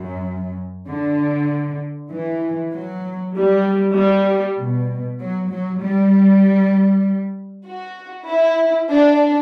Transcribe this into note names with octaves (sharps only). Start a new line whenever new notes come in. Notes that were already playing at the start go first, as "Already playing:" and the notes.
Already playing: F#2
D3
E3
F#3
G3
G3
B2
F#3
F#3
G3
F#4
E4
D4